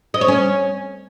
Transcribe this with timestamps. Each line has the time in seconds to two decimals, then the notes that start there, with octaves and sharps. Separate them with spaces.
0.14 D#5
0.21 C#5
0.28 C#4